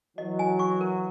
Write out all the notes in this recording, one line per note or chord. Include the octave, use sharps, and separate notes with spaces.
E3 F#3 D#5
G#5
C#6
A#4